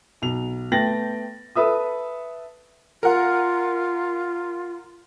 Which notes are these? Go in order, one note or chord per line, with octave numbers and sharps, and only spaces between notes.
B1 F7
A3 B3 G5 A6 A#6 F#7
A4 B4 E5 D#6
F4 A#4 F#5